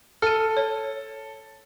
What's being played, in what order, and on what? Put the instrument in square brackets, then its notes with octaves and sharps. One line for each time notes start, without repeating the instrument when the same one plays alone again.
[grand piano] A4 [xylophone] F6 D#7
[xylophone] C#5